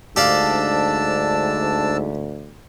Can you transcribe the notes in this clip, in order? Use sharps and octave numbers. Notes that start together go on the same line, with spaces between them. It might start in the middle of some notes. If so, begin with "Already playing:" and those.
D2 G#2 D4 G4 D5 F5 A5 E6